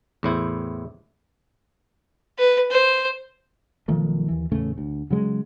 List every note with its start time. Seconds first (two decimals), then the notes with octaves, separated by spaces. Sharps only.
0.23 E2 A2 E4 C5
2.39 B4
2.71 C5
3.88 B1 D#3 F3 A3
4.28 D#2 E3
4.52 E2 A2 C#3 A3
4.78 D2
5.10 C#3 F#3 G#3